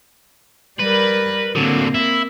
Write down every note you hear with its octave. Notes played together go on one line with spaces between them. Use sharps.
G3 A#4 B4
D3 F#3 A#3 C4
E4